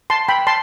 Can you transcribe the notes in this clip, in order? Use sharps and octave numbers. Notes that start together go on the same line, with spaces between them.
A5 C6
G5 B5
A5 C6